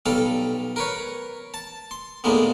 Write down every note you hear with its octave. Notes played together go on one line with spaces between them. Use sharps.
B1 G3 A4 F5
A#4 B4 C#5
A5
C6
D#2 A2 D3 G#3 A#3 B3